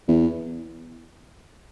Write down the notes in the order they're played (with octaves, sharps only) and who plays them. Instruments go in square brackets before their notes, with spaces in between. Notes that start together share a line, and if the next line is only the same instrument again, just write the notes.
[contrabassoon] E2